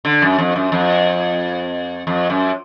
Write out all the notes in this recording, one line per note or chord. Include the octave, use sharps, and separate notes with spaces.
D3
F#2
F2
F#2
F2
F2
F#2